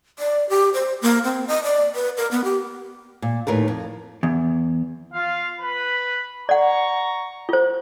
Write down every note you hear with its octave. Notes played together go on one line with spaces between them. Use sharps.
D5
G4
C5
A#3
C4
D#5
D5
B4
A#4
B3
G4
A#2
D#2 A2 A#4 B4
F2
E2
F4 F5
B4 B5
D5 F#5 A#5 C#6
F4 C5